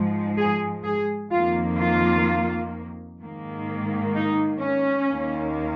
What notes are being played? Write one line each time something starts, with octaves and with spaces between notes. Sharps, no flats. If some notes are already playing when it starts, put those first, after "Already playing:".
Already playing: G#2 F3 G#3
G#4
G#4
F2 D#3 A#3 F4
F4
G#2 D#3 A#3
D#4
C#4
D#2 D#3 A#3